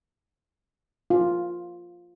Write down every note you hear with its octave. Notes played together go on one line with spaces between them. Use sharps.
F4